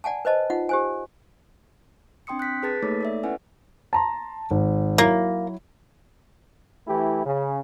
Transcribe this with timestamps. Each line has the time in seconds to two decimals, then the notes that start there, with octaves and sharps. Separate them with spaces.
0.04 D5 F#5 G#5 A5
0.25 B4 C5 D#5 A5
0.50 D#4 F4 F#5
0.69 G4 C5 G#5
2.27 C4 D4 G5 C6 D#6 C#7
2.39 F#6 G6 B6
2.63 G#4 B4 A5 A6 B6
2.83 A3 A#3 D#4 A4 C#5 D6
3.01 A4 D5 E5
3.23 B3 C#4 E4 B4 F#5 G#5
3.93 A5 A#5 C6
4.51 G#1
4.98 F#3 A#3 E4
6.88 E3 A3 E4 G4
7.26 C#3